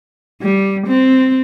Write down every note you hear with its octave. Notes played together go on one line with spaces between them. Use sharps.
G3
C4